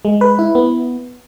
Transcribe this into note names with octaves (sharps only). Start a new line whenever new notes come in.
G#3
B4
E4
B3